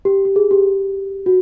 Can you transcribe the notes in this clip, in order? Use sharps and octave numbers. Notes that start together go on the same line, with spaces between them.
G4
G4
G#4
G4
F#4